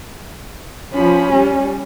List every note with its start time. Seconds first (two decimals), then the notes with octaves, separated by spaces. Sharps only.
0.95 F3 C#4 B5
1.33 G3